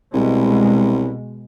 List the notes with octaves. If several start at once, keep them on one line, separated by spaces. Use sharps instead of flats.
C2 B2 G#3